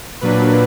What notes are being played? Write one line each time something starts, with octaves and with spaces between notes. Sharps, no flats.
A#2 F#3 A#3 D4 B4